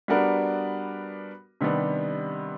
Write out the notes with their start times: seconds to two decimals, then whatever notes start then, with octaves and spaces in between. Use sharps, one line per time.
0.08 G3 B3 D4 F#4 A#4
1.61 C3 D#3 G3 B3 D4